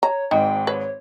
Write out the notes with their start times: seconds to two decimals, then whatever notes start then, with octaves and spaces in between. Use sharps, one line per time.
0.03 C#5 A#5
0.31 G#1 G#2 D#4 G5
0.67 B4 C#5